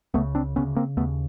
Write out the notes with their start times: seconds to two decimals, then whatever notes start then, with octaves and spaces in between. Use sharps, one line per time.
0.14 C#2 C#3 A3 B3
0.35 C4 D4
0.56 D2 C#3 B3 C#4
0.76 A#3 C4
0.97 D#2 C#3 A3 B3